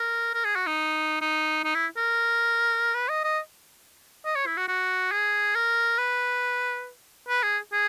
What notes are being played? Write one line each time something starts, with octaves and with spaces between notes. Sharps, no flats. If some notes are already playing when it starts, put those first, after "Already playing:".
Already playing: A#4
A#4
G#4
F#4
D#4
D#4
D#4
E4
A#4
B4
D#5
D#5
D#5
C#5
E4
F#4
F#4
G#4
A#4
B4
B4
G#4
G#4